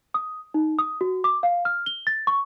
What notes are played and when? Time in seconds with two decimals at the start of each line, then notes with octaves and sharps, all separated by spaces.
0.14 D#6
0.54 D#4
0.79 D#6
1.01 F#4
1.24 D6
1.43 F5
1.65 F6
1.86 G7
2.07 A6
2.27 C#6